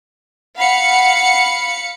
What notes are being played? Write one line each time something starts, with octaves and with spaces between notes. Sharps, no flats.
F5 F#5 B5 C#7